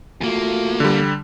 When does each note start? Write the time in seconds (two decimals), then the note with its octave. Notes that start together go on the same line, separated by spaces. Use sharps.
0.21 E2 A3 A#3 F4 F#4
0.80 D3 G3